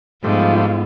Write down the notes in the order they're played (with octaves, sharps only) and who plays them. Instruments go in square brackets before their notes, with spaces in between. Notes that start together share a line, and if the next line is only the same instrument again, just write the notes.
[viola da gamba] G#2 [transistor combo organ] F3 G3 A3 [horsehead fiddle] B3 F4